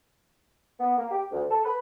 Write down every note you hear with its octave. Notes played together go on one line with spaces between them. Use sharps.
B3
A#3
G4
D2
A4
B4